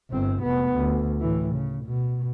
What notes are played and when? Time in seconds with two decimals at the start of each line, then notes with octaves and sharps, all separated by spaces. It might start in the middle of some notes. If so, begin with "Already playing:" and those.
0.11 G1 C4
0.42 F1 B3
0.76 D2
1.21 A2 E3
1.55 C#3
1.85 B2